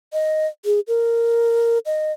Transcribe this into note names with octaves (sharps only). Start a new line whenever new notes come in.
D#5
G#4
A#4
D#5